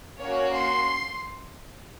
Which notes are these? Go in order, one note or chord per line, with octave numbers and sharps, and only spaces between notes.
A#3 C#4 F#4 C#5
C6